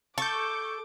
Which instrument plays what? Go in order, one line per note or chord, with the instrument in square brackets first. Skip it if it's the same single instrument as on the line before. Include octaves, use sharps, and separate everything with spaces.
[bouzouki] A4 [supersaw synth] C#6 G6 [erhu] D6